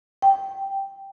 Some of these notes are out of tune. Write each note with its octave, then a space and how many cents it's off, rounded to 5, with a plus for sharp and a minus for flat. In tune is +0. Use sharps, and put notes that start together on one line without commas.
G5 +0